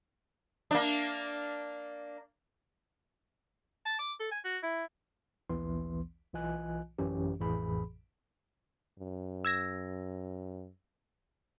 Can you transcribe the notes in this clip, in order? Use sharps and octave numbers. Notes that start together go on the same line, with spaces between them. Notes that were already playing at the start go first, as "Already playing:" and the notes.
A#3 D4
A5
D6
A4
G#5
F#4
E4
A#1 D#2 E3 B3 C6
B1 E3 F4 D#5 G#5 F#6
A1 F#2 E3 C#4 G4
A1 F2 A2 E3 G#4 B5
F#2
E6 G#6 A#6